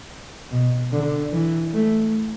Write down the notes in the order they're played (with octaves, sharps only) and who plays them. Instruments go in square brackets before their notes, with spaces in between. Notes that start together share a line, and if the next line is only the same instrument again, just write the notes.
[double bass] B2
D3
E3
A3